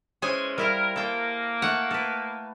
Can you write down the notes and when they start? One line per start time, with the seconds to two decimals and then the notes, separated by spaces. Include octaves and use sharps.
0.22 E3 G#3 C#4 G#4 C5 G#5
0.58 G3 E4 F4 A#4
0.96 A#3 A4 G5
1.62 A3 F#5
1.91 A4 B4